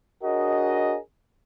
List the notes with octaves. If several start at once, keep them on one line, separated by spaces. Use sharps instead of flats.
D4 F#4 G#4 A#4 C#5 D#5